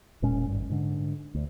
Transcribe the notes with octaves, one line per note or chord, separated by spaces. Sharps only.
E1 A#2 G#3 C#4
G#1 G2
G#2 D3
D2